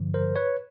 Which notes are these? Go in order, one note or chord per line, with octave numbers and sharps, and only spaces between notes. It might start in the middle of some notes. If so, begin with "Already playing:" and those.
Already playing: G2 D3 F3
A#4 C5
B4 C#5